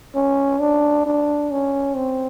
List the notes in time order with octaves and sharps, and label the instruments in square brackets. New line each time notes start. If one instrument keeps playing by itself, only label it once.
[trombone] C#4
D4
D4
C#4
C4